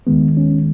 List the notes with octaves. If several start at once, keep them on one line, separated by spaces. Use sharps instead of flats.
D#2 D#3 G#3 B3
C#4